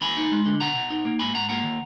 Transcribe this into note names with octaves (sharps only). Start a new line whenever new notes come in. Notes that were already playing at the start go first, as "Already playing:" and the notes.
D#2 G#5 B5
D#4
G#3
D3
B2 F#5 A#5
B2
D#4
A#3
G#2 G#5 B5
G#2 F#5 A#5
A#3 F#5 A#5
D#3